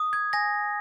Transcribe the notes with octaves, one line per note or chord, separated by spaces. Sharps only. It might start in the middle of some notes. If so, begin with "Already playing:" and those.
Already playing: D#6
G#6
G#5 A#6